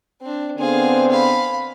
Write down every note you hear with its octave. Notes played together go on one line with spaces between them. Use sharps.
C4 D4
D3 B3 C4 G#4 F5
F5 B5